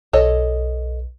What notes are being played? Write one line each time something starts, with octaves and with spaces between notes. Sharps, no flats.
B1 A4 C#5 D#5